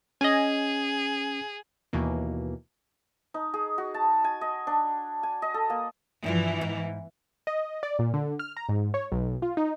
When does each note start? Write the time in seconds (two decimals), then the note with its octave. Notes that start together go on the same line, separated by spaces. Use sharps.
0.21 C#4 G#4 D#5 G#5
1.93 D#2 B2 E3 A#3
3.34 D#4
3.54 G#4
3.78 F#4
3.94 A5
4.24 G#5
4.41 D#5
4.67 D4
5.23 G#5
5.42 D#5
5.54 A4
5.70 A#3
6.24 G2 B2 E3 F3
6.61 G#2
7.47 D#5
7.83 D5
7.99 A#2
8.14 D3
8.39 F6
8.57 A#5
8.69 G#2
8.94 C#5
9.12 B1
9.42 F4
9.57 D#4